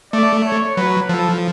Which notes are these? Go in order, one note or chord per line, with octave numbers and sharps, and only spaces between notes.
A3 D5
C#5
F#3 B4
F3 A4